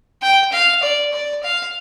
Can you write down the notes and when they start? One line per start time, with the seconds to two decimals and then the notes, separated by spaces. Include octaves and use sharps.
0.22 G5
0.52 F5
0.82 D5
1.13 D5
1.43 F5